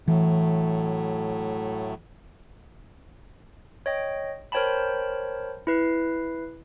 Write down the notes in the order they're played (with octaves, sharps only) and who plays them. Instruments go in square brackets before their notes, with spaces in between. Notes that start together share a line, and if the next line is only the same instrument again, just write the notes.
[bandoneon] A2 F#3 A3 [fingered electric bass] E3
[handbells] C#5 D#5 G5
A#4 C5 C#5 G5 A5 B5
E4 B4 C7